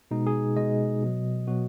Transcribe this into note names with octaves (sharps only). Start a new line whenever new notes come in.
B2 G#3 D#4
G#4
B2 G#3 D#5
B2 F#3
B2 F#3 F#4